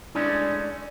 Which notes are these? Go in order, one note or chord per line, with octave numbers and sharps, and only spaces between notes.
G#3 A3 C#4 D4 E4 D5